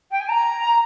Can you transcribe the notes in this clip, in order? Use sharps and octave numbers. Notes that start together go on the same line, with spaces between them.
G5
G#5
A#5